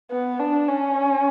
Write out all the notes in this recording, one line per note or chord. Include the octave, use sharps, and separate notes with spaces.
B3
D4
C#4